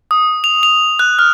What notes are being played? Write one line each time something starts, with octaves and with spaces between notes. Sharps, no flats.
D#6
F7
F7
F#6
F6